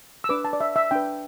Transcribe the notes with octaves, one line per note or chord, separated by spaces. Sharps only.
E6
D4 B4 D6
A5
D5
E5
E5
D4 B4 G5